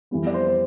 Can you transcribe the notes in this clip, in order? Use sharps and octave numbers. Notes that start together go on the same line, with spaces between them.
F2 E3 G3 B3
D5
C5
C5